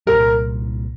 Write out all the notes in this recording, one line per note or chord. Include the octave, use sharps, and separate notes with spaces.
C2 A#2 G3 A#4